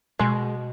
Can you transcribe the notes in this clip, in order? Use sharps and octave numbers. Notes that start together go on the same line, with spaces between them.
B2 G#3